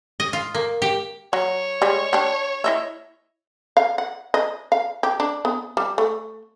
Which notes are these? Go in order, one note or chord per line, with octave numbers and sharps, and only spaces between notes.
D#5
F4
A#3
G4
F#3 C#5
G3 G#3
D4 G4
E4 D#5 E5
F5
F#5
D#5
F5
G4
D4
B3
G3
A3